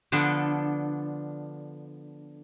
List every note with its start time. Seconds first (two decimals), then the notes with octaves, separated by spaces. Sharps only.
0.12 D3 F3 B3 D4 A4